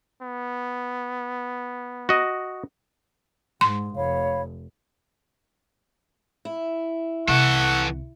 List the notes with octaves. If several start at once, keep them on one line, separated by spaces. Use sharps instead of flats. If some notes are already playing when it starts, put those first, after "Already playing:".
B3
F#4 D#5
G#2 C6
F1 C#5 F5 B5
E4
C2 C3 E3 A4 F#5 C#6